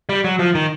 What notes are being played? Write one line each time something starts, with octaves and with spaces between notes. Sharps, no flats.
G3
F#3
F3
D#3